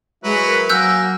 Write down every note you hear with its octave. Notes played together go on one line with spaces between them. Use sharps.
F#3 G#3 E4 B4
A#4
F#3 A#3 G#5 E6 F#6 G6